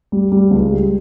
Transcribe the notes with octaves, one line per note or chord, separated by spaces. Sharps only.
G3
G3
C#2
G3